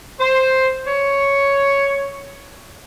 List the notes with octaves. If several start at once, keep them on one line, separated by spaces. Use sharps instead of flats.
C5
C#5